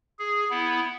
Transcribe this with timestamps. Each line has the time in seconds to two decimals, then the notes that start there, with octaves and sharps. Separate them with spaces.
0.19 G#4
0.50 B3 E4